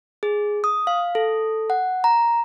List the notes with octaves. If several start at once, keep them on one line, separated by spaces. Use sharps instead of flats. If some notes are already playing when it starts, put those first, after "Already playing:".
G#4
D#6
F5
A4
F#5
A#5